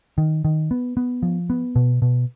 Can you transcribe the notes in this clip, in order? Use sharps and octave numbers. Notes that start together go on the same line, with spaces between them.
D#3
D#3
B3
B3
F3
B3
B2
B2